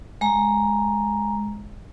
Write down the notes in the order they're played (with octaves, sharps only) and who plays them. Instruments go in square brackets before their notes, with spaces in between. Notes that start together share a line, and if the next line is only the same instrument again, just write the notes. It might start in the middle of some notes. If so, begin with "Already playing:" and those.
[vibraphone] G#3 A#5